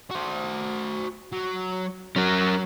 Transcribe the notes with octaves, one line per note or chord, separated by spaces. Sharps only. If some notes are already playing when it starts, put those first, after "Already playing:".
F#4 C5
F#3
F#3 C#4 A#4